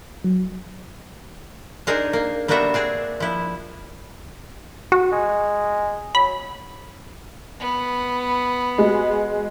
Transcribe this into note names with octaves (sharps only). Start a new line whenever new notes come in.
F#3
D4 D#4 G#4 A#4 C5
A#3
G3 A#3 B3 D4 F#4 E5
C4 D4 G#4
F3 E4
F#4
G#3
F#3 B5
B3
G#3 F#4